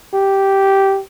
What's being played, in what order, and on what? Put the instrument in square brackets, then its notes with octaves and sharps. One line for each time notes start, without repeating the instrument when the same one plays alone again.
[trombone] G4